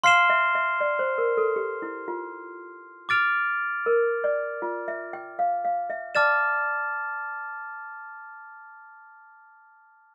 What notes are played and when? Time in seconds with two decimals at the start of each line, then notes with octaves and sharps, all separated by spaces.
0.04 F5 C6 F6 C7 E7 G7
0.30 E5
0.55 E5
0.81 D5
0.99 C5
1.18 A#4
1.37 A4
1.56 G4
1.82 E4
2.08 F4
3.09 D6 F6 A6 D7 F7
3.86 A#4
4.24 D5
4.62 F4
4.88 E5
5.13 G5
5.39 F5
5.65 F5
5.90 E5
6.15 D5 A5 D6 F6 A6 E7